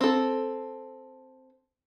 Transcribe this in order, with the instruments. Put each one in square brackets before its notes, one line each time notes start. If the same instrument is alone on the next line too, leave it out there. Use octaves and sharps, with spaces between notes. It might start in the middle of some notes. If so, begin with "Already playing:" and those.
[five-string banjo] C4 A4